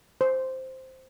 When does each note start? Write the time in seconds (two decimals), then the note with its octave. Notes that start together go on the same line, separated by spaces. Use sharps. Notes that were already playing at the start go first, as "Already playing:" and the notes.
0.21 C5